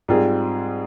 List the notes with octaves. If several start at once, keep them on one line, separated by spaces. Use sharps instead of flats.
G#2 G3 C4 F4 G#4